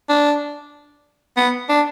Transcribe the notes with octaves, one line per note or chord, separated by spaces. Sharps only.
D4
B3
D4